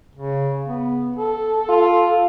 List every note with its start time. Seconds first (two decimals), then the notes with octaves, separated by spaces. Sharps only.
0.15 C#3
0.68 B3
1.16 A4
1.69 F4